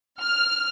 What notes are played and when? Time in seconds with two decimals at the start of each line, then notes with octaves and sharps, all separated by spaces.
0.20 F6